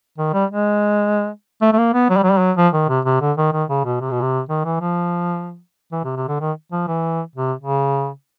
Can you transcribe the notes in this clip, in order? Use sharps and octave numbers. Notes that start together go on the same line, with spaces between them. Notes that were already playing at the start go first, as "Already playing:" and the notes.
D#3
G3
G#3
A3
A3
A#3
B3
F#3
G3
F#3
G3
F#3
F3
D#3
C3
C3
D3
D#3
D#3
C#3
B2
C3
B2
C3
D#3
E3
F3
E3
C3
C3
D3
D#3
F3
E3
C3
C#3